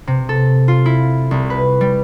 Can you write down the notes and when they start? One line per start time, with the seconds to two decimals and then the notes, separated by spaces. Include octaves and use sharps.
0.07 C3
0.29 A4
0.68 F4
0.86 E4
1.31 C2
1.50 B4
1.81 G3